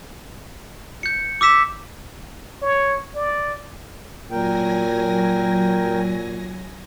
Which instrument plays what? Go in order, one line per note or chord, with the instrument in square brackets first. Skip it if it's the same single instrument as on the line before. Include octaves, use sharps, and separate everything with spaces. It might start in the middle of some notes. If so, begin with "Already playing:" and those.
[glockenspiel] G6 C#7
D6 E6 B6 E7
[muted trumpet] C#5
D5
[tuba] A#2 [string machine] F#3 G#5 A#6 [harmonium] A#4 G5